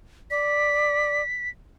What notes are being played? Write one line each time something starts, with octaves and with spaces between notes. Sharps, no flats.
D5 B6